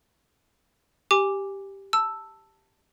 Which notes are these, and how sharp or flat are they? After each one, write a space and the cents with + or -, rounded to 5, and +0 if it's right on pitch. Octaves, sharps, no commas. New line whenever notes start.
G4 +0 G#5 -15 D6 +0
A5 +10 E6 +0